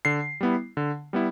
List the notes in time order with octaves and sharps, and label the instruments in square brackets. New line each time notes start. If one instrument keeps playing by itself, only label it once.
[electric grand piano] D3 C7
G3 B3 E4
D3
G3 B3 E4